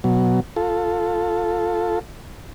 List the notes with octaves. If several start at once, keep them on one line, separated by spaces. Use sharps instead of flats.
B2 F#3
F4 A4